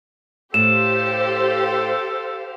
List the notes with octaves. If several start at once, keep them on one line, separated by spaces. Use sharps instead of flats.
A2 G4 A4 C5 F5 E7